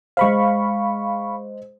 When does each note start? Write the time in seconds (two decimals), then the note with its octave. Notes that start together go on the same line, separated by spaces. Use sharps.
0.17 G#3 C5 F5 B5 C#6